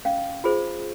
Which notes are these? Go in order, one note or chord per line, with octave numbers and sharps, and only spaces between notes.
C#4 F5
F4 G#4 C5